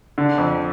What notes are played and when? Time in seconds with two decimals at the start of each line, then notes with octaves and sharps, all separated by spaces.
0.18 D3
0.38 F2